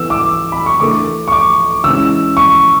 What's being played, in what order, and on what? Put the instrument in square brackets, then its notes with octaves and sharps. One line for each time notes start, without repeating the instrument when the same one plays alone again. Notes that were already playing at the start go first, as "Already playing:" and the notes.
Already playing: [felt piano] E3 B3 E4 A4 [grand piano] E6
[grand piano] D6
B5
C#6
[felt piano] E3 A3 D4 A4 [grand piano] D6
[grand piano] C#6
D6
[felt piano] E3 G#3 C#4 E4 [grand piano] E6
[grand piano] C#6